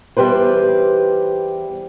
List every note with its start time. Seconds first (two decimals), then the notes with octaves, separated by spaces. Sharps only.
0.17 E2 G3 G4 B4 C5